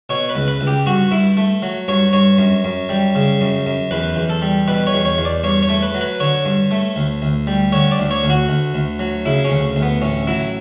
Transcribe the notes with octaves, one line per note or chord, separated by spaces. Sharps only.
B2 C#5
B4
C#2
B4
C#2
G4
G2 F#4
G2 E4
A3
F#3
G2 C#5
G2 C#5
F#2
F#2
G3
C#3
F#2
F#2
E2 B4
E2
A4
G3
B2 B4
C#5
E2
C#5
E2
D5
G2 C#5
C#5
A3
B4
F#3
B4
D3 C#5
G2
A3
D2
D2
G3
D3 C#5
D5
D2
C#5
D2
F#4
D2
D2
F#3
C#3 E4
C#4
D2
D2
B3
A1 C#4
F#3 E4